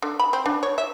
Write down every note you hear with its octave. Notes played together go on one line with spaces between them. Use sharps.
D3
B5
C4
D4
C#5
E5